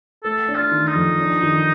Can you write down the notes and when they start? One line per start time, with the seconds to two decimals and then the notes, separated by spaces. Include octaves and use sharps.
0.24 A3 A4
0.48 D4
0.56 F4
0.71 D#3
0.87 D#4
0.95 F2
1.19 D4
1.43 D#3